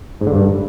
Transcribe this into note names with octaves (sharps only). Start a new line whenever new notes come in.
G#2
D3
G2